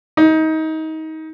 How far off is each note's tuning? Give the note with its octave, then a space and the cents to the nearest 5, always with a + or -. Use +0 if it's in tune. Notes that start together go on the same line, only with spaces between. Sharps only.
D#4 +25